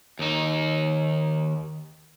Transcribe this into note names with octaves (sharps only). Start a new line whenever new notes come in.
D#2 D#4